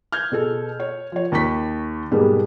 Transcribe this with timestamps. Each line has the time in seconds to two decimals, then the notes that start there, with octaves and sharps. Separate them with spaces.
0.12 F6 G6 G#6
0.32 B2 G#4 A4
0.80 C#5
1.12 F3 C#5
1.32 D#2 A#5 C#6 B6
2.11 G#2 B2 G3 G#3 A#3 B3